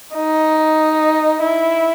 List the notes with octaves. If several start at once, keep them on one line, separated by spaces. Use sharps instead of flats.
D#4
E4